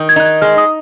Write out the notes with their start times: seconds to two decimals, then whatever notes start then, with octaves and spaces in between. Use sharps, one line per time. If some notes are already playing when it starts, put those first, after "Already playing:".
Already playing: D#3
0.09 G#6
0.16 D#4 F#6
0.25 G#6
0.41 G#3 F6
0.58 D#6